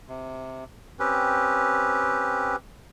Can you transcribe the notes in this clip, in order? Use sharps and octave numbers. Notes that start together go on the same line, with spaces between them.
C3
C4 C#4 G4 B4